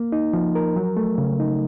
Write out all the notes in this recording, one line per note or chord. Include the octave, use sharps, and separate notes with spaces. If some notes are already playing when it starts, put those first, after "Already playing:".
Already playing: A#3
D#4
F3
A#4
F#3
A3
C#3
D#4